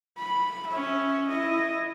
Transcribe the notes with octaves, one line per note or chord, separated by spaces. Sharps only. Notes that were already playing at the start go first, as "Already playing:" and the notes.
B5
C#4 E5
E4 D#5